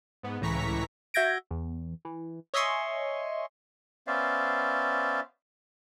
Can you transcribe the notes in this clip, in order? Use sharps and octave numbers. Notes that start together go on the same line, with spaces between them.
G#2 B3
C#2 A2 E3 A#5 C#6 B6
F#4 E5 G6 G#6 A#6 D7
E2
E3
C#5 D#5 E5 G#5 C6 C#6
B3 C#4 C5 D5 E5 F5